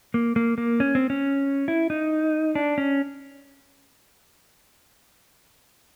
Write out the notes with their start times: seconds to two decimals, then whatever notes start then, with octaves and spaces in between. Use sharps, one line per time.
0.14 A#3
0.36 A#3
0.58 A#3
0.80 C#4
0.95 C4
1.10 C#4
1.68 E4
1.90 D#4
2.55 D4
2.78 C#4